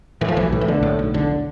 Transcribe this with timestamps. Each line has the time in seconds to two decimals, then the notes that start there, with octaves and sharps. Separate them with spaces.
0.21 A2 E3
0.29 F3
0.36 B1 E3
0.52 A2
0.61 E3
0.68 B1 D3
0.83 A2
0.99 B1
1.14 F1 D3